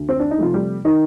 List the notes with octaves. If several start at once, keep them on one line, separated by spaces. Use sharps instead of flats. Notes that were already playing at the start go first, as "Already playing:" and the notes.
Already playing: D2
C4
D4
D#4
C3 F3 A3 F4
G3 G4
D#3 D#4